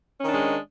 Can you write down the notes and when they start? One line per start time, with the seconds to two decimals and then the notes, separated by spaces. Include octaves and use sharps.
0.19 C#4
0.24 D#3
0.28 D4
0.32 G#3